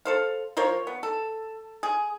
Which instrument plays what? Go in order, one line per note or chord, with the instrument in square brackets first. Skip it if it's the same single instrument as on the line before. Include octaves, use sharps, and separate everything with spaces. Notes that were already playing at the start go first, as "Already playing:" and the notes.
[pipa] A4 C5 F5
F3 A#4 C5 C#5
B3
A4
G#4